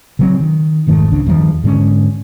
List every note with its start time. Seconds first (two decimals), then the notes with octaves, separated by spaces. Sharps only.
0.19 C#3 F#3 C4
0.40 D#3
0.87 F1 G#2 D#3 A3
1.12 C#2 C#3 D4
1.26 E2 G2 D#3 F3
1.64 G#2 D3 G#3 C#4